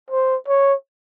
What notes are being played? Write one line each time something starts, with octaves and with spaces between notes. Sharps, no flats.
C5
C#5